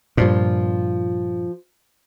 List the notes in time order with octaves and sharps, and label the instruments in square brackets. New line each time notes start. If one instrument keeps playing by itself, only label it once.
[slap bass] G2 A#2 [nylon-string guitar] F3 F4